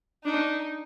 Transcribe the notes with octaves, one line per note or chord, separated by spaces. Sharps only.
D4 D#4